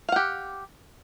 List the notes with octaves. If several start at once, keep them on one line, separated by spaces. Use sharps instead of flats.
G4 F5 F#5